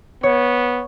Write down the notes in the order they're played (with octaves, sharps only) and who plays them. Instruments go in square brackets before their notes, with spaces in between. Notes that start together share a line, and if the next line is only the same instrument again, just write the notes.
[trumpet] B3 [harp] C#5